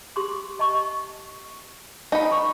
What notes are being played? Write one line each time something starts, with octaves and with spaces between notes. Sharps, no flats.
G4 C6 D6
D#5 A5 C#6
D#4 G5 B5
C#6